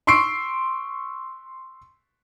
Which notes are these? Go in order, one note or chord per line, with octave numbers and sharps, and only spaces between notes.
C6 C#6 E6 C7 D7